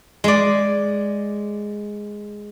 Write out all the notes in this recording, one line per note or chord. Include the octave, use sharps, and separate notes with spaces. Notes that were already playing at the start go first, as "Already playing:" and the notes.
G#3 D5